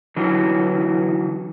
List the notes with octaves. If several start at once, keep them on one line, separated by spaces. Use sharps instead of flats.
D3 E3 F#3